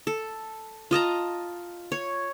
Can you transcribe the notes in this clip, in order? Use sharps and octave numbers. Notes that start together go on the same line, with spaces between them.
A4
F4 D#5 A5 A#5
C#5